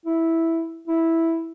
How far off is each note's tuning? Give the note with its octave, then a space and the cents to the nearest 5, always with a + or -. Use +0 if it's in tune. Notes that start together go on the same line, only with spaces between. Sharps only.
E4 -5
E4 -5